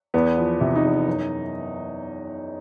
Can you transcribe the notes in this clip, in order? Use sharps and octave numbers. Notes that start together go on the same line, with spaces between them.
E2 B3
F3
C3
D#4
E2
F#2